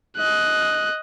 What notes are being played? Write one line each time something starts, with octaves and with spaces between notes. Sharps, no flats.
D#5 F#6